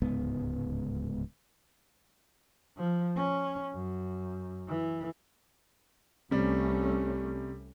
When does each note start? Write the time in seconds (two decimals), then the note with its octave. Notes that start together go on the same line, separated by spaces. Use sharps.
0.02 D1 C#2 G#2 B3
2.77 F3
3.16 C#4
3.75 F#2
4.68 E3
6.31 C2 C3 G3 A3 C#4